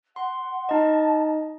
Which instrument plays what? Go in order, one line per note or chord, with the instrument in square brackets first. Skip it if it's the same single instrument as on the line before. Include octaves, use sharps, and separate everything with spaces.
[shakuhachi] F#5 [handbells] C6
[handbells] D#4 D#5 [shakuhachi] A5